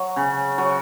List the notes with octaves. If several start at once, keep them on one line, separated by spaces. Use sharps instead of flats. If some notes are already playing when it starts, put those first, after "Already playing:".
Already playing: F#3
C#3
F#3